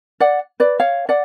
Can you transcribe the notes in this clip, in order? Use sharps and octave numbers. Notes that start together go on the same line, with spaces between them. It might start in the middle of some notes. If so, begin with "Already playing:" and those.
D5 F#5
B4 D5
C#5 F5
D5 F#5